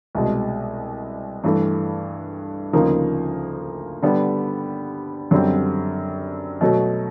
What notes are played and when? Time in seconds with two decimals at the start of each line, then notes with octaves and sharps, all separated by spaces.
0.15 C2 B2 G#3
1.44 G2 E3 A3
2.73 D2 C#3 F3 A#3 D#4
4.02 D3 G3 B3
5.31 F#2 D3 G3 C4
6.61 B2 F#3 A3